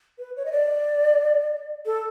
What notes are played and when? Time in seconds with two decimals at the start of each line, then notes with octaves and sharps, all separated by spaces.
0.19 B4
0.37 C#5
0.45 D#5
0.52 D5
1.86 A4